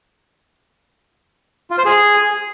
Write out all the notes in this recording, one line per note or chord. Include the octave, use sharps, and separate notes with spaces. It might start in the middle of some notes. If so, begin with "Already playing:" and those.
F4
C5
G#4